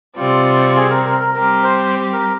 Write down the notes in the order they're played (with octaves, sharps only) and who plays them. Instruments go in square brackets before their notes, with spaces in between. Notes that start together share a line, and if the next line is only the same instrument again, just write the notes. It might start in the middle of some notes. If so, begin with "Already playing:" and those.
[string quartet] C3 G3 C4 [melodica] F4
[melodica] G#4
A#4
A#4
A#4
[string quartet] G3 C4 G4 [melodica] A#4
[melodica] C5
A#4